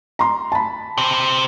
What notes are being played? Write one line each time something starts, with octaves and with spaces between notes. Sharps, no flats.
A#5 C6
A5 B5
C3 C5